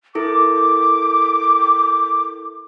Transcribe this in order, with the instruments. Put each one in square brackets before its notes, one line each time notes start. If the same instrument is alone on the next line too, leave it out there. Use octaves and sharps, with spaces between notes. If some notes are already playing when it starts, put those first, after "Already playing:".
[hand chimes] E4 A4 A#4 [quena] D6